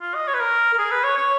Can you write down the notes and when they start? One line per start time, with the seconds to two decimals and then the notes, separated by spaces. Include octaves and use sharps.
0.02 F4
0.15 D#5
0.28 C#5
0.34 B4
0.40 A#4
0.74 A#4
0.79 G#4
0.91 B4
1.04 C#5
1.18 C#5